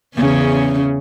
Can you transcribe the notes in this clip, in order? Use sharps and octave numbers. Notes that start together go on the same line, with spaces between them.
E2 C#3 C#4